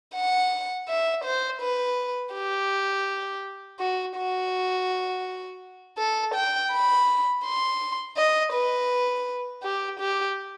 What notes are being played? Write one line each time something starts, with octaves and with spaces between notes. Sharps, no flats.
F#5
E5
C5
B4
G4
F#4
F#4
A4
G5
B5
C6
D#5
B4
G4
G4